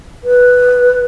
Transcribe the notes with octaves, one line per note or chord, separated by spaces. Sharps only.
B4